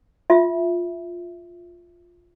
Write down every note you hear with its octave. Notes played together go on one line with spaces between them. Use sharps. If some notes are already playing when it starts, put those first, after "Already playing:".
F4 E5